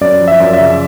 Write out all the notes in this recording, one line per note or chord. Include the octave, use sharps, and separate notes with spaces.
F#2 D5
F3
E5
F#2
E5
C#3